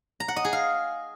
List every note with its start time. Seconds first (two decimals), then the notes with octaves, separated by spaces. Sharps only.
0.20 A#5
0.28 F#5
0.36 D#5
0.45 G#4
0.53 F5